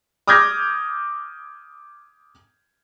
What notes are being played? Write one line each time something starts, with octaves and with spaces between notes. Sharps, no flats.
D6 D#6 F6 G6 G#6 A#6